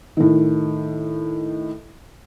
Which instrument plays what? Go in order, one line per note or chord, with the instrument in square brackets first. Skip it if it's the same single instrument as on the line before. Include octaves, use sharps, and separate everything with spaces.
[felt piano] A2 D#3